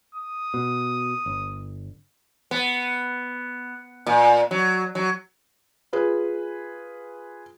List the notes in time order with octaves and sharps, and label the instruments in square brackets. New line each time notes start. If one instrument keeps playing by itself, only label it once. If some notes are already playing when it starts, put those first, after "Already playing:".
[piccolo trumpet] D#6
[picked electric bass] B2
G1
[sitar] B3
A#2
F#3
F#3
[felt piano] F4 G#4 B4